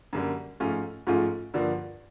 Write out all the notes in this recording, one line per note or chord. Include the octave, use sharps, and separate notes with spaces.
F#2 D3 G3 A#3
G#2 F3 A3 C#4 F4
G#2 F3 A3 C#4 F4
G2 D3 F3 A#3